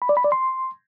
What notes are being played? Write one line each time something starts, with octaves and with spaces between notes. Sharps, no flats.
B5
D5
B5
D5
C6